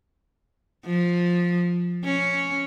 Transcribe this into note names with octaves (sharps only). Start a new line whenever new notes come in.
F3
C#4